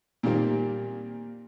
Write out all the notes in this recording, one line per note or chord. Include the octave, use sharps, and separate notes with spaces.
A#2 D#3 G3 A#3 C4